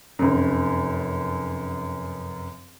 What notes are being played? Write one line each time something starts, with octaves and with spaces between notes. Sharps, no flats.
F1 F#2